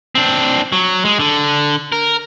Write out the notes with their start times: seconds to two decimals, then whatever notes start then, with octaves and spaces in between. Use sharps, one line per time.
0.15 C4 D4
0.72 F#3
1.05 G#3
1.20 D3
1.92 A#4